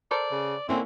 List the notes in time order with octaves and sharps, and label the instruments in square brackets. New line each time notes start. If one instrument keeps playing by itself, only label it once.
[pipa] A4 A#4 C5 [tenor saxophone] D5
[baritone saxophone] C#3
[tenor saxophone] D3 [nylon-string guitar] A#3 C#4 E4 [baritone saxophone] C4